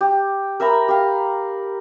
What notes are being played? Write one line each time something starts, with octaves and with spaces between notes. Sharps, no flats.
G4
A#4 E5 A#5 B5
G4 F5